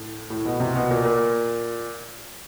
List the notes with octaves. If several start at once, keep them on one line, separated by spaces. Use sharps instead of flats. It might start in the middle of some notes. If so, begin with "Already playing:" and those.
Already playing: A2
A2
B2
C3
B2
A#2
A#2